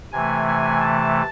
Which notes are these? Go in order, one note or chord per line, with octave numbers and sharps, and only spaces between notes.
C3 E3 A3 G#5
G#5
A5